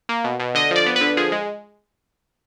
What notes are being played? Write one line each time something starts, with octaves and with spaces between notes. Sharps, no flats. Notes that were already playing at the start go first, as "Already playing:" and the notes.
A#3
B2
B2
D3 D#5
F3 D5
B3
B4
D3
F3 G#4
G#3